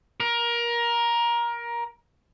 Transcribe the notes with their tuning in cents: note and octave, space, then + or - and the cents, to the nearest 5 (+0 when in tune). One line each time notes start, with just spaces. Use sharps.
A#4 +20